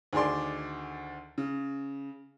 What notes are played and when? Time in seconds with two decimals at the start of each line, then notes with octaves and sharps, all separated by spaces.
0.13 D2 D#3 G#4 D5 C6
1.38 C#3